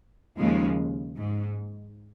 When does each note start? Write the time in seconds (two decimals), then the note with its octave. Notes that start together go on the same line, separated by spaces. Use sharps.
0.38 D#2 C#3 F3 G#3
1.16 G#2